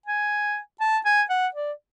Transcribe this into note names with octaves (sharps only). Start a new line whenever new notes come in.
G#5
A5
G#5
F#5
D5